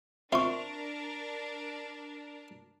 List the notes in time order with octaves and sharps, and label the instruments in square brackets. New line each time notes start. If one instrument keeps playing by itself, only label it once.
[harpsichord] C4 E4 F4 [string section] D4 A#4 [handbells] C6 C#6